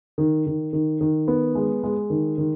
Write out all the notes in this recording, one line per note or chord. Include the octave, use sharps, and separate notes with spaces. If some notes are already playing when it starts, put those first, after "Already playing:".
D#3
D#3
D#3
D#3
B3
G#3
G#3
D#3
D#3